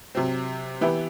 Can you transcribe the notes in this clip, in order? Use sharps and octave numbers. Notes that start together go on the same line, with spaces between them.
C3 F#3 C4
E3 B3 E4 G4